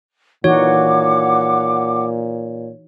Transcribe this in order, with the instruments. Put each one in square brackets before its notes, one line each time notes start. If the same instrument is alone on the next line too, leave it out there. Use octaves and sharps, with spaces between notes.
[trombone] A#2 [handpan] E3 D#4 F#4 [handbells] C#5 [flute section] F#5 D6